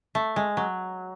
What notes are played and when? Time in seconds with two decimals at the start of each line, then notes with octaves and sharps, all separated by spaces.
0.15 A3
0.36 G#3
0.57 F#3